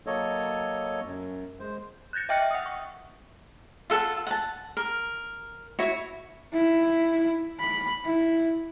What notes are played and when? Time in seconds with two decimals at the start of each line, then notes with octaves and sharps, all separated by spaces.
0.06 F#3 A#3 A4 C#5 D#5
1.05 F#2
1.60 G#3 C5
2.13 F#6 G6 A6 A#6 C#7
2.29 D#5 E5 G5 F6 F#6 C#7
2.51 F#5 D#6
2.66 C#6
3.90 F4 A4 F#5 A5
4.27 F#5 A5
4.77 A#4
5.79 E4 F#4 C#5
6.53 E4
7.61 B5
8.05 E4